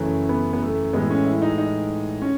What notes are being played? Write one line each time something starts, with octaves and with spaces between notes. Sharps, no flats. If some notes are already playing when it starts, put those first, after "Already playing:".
Already playing: F#2 C#3 E3 A3 C#4
B3
B3
A3
A2 E3 G#3 B3
C#4
E4
D#4
D#4
C#4